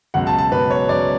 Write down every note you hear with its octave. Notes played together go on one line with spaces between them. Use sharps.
C#2 B2 F#3 F#5
A5
A5
C#2 B2 F#3 B4
C#5
C#2 B2 F#3 D5